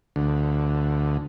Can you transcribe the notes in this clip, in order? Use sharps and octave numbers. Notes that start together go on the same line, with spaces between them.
D2